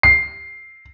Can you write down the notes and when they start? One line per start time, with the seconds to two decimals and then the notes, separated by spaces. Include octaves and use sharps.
0.03 C7